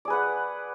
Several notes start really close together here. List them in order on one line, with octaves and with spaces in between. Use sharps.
D5 G#4 B4 F#5